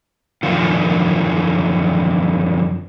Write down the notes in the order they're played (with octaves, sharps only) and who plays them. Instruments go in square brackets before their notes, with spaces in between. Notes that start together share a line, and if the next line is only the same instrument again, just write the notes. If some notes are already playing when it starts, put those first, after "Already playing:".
[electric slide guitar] F#2 A2 D3 D#3 F3 F4